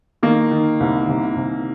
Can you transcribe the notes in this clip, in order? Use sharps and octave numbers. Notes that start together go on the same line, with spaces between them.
D#3 A#3
D#3
C2
C2
C2